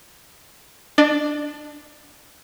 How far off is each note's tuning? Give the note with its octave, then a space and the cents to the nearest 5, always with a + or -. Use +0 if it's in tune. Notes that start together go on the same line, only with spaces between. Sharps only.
D4 +0 D5 +40